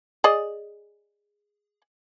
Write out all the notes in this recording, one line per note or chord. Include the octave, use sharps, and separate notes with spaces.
G#4 D5 D#5